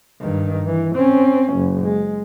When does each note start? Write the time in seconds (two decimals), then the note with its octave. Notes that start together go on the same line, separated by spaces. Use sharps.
0.21 G2 D#3
0.67 E3
0.96 C4 C#4
1.54 F#1
1.84 G#3